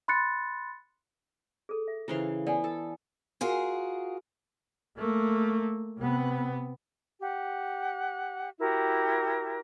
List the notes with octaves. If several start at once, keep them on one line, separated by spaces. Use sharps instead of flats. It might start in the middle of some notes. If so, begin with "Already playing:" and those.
B5 C6 F#6 A6 C#7
G#4 A4
E5
C#3 E3 E4 F4 C5 F5
B3 D5 F#5 G#5
A4
F4 F#4 G#4 A#4
A3 A#3
C3 B3
G4 F#5
E4 F#4 G4 A#4